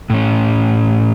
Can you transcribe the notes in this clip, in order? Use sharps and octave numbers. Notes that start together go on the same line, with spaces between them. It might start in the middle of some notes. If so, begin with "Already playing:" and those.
A2 C#4